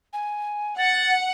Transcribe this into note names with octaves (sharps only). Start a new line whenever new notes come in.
G#5
F#5 A6